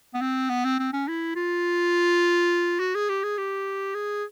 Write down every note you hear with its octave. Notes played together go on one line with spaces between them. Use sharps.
B3
C4
B3
C4
C4
C#4
E4
F4
F#4
G#4
G4
G#4
G4
G#4